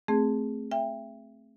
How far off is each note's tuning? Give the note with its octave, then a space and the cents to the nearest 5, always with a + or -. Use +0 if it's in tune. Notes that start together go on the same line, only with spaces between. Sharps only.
A3 +0 C4 +0 G#4 -5
E5 +25 G5 +25